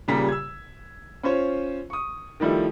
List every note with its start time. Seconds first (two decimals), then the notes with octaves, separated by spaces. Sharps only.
0.08 D#1 A#2 C#3 G3 A#5 B6
0.29 E6 G#6
1.23 C#4 F4 C5 C#5
1.90 C#6 D#6
2.40 D#3 F3 G3 A3 E4